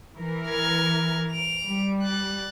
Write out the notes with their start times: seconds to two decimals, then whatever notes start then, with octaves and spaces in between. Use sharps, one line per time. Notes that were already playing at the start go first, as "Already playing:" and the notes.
0.16 E3 A#4
0.49 F6 G#6
1.31 D7 F7
1.64 G3
2.03 F#6 A6